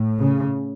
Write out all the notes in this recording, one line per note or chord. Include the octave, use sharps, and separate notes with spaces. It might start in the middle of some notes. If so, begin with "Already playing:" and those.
Already playing: A2
C#3